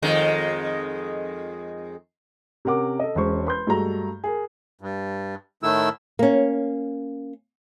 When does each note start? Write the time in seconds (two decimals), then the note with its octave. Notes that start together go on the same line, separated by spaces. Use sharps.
0.02 F2 D#3 G#3
2.65 C3 C#4 A#4 F#5 D6
2.99 A4 D#5
3.15 E1 G#3 C#4 C5 C#6
3.47 B4 C6 G6
3.67 G2 G#3 A3 F#4 A4 A#5
4.24 G#4 A#4
4.81 G2
5.63 A2 D#3 A3 E4 E6
6.19 A#3 C#4